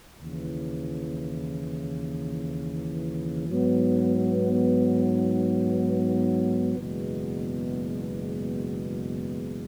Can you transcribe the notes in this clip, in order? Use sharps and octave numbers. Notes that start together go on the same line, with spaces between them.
D#2 C#3 E3
G#2 F#3 B3 D#4
F#1 E2 B2 G#3